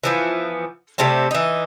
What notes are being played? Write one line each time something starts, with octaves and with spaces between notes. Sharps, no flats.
E3 F3 B3
C3 G3 A3 C4
E3 D#4